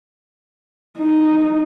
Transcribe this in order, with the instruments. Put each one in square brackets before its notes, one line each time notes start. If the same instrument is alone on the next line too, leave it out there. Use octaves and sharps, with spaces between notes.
[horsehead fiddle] D#4